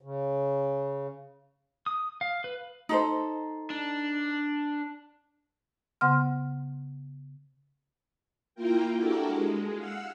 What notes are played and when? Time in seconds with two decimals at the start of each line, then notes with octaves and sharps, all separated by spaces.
0.01 C#3
1.86 D#6
2.21 F5
2.44 B4
2.89 D#4 A4 C5
3.70 D4
6.01 C#3 B3 F#5 C6 F6
8.55 A#3 E4 F4 A#4 G5
8.97 D4 E4 F#4 G4 A4 A#4
9.27 G#3
9.75 F5 F#5 E6